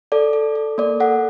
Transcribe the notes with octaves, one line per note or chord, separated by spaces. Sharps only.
A4 D5
A4
A4
A#3 D5
A4 F#5